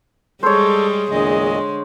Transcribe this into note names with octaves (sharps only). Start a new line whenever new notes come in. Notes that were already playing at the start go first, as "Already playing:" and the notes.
G3 G#3 G#4 A4 C5 C#5
E2 A#2 D3 G#3 D#5